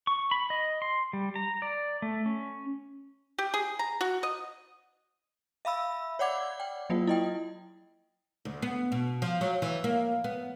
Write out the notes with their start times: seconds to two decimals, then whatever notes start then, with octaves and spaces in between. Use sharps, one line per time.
0.07 C#6
0.31 B5
0.50 D#5
0.82 C6
1.13 G3
1.36 A#5
1.62 D5
2.02 A3
2.26 C#4
3.38 G4
3.54 G#4
3.79 A#5
4.01 F#4
4.23 D#5
5.65 E5 F5 B5 E6
6.19 C#5 D5 F#5 D6 G#6
6.60 G5
6.90 F#3 A#3 F4
7.07 E4 D#5 G5
8.45 D2
8.62 B3
8.92 B2
9.22 F3
9.41 F#3
9.62 E3
9.84 A#3
10.24 B3